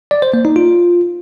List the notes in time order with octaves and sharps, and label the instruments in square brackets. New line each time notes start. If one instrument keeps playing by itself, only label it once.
[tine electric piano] D5
C5
A#3
D#4
F4